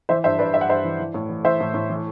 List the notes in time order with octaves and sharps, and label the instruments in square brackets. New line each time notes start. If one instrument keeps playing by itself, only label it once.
[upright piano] E3 C5 E5
G2 C5 E5
G2 B4 D5
G2 E5
F#5
G2 C5 E5
E3
E3
A2
E3
E3 C5 E5
A2
A2
E3